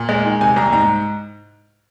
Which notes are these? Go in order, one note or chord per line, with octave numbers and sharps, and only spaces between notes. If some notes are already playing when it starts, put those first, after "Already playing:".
Already playing: A#2
G#3
D#3
C3 G#5
C2 A#5
G#2 A#5